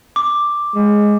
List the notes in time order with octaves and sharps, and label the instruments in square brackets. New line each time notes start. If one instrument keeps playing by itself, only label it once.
[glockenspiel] D6
[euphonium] G#3